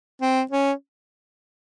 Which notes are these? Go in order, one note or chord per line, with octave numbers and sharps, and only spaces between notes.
C4
C#4